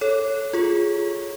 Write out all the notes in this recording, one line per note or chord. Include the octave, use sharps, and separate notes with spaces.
A4 C#5
F4 G#4